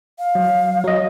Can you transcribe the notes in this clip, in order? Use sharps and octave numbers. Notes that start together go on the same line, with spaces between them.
F5
F#3
F#3 D#5